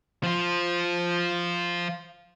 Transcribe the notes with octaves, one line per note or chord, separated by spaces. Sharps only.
F3 F4